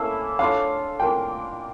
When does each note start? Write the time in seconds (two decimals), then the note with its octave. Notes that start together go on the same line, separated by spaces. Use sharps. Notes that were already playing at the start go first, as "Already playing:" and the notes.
Already playing: A#3 C#4 E4 A4 E5 F5
0.39 D4 F4 A4 C#5 F5
1.00 A#3 D4 F4 A#4 G5